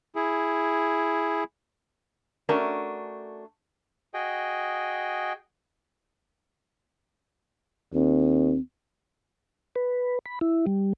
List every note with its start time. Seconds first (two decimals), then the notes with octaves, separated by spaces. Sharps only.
0.15 E4 G#4
2.49 A3 C#4 D4 F#4 A#4
4.14 F#4 G#4 D#5 G5
7.93 D#2 C4
9.76 B4
10.26 B5
10.41 E4
10.67 G3